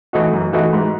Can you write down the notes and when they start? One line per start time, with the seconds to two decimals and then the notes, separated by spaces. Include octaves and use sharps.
0.13 E3 A3 D#4 F#4
0.33 F#2
0.53 E3 A3 D#4 F#4
0.73 G#2